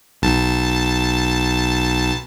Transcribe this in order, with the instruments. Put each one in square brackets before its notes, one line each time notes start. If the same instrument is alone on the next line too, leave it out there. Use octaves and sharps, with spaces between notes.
[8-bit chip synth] B1 A5